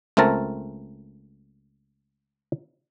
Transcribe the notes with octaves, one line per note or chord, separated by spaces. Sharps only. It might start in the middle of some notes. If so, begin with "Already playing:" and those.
C#2 A3 C4 A#4 A5